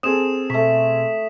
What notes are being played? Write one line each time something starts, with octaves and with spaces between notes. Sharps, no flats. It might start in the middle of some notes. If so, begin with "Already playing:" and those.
C4 G#4 A4 D#6 E7
B2 A3 C#6 B6